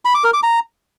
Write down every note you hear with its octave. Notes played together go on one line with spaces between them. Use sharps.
B5
D6
A#4
D6
A#5